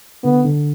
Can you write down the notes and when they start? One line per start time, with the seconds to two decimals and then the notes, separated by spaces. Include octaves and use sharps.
0.24 D3 B3
0.44 D3